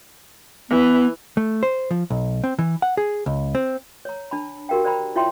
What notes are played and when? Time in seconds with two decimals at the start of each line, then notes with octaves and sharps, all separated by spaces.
0.70 E3 B3
1.37 A3
1.63 C5
1.91 F3
2.10 B1
2.44 C4
2.59 E3
2.82 F#5
2.97 G#4
3.26 C#2
3.55 C4
4.05 C#5 A#5
4.31 D4 A5 B5
4.69 F#4 G4 A#4 F5 G5
4.84 C5 D5 G5 A#5 B5
5.16 E4 F4 C#5 E5 G5 C6